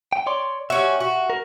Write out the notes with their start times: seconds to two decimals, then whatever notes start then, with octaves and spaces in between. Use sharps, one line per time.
0.13 G5
0.26 C#5 D5 C6
0.70 G3 C#4 F#4 E5
1.00 F#4
1.30 A#4